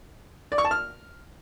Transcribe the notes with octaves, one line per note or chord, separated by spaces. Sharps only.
D5
C#6
A5
F6